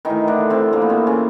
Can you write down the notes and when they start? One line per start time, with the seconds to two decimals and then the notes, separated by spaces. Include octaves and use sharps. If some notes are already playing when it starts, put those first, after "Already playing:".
0.05 A2 D#3 E3 D#4
0.28 D3 D4
0.50 C3 C4
0.73 A#2 A#3
0.82 B3
0.89 C3 C4
1.07 C#3 C#4